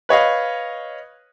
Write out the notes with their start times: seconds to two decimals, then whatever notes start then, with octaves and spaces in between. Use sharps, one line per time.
0.09 B4 C#5 D#5 F5